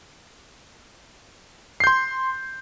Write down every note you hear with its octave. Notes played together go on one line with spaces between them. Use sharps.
C6 G6 C7